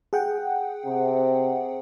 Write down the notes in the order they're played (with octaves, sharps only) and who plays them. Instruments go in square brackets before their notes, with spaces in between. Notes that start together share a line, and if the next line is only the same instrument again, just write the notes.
[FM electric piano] G#4 F#5 G5
[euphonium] C3